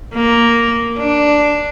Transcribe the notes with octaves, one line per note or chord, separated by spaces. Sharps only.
A#3
D4